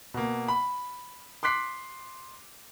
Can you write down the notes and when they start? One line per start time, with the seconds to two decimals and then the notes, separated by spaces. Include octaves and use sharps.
0.14 B2 A#3
0.48 B5
1.43 C6 D6 F#6 B6 C7